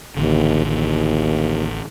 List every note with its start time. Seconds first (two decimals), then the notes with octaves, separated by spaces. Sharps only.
0.17 A1 D#2 D3
0.66 D#2